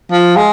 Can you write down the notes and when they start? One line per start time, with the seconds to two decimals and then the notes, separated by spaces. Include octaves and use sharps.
0.12 F3
0.37 G#3